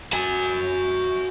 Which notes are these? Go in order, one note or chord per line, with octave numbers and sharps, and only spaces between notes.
F#4 G#5